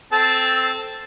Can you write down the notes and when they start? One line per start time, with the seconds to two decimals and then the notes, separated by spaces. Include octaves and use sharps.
0.12 C4 A4 A5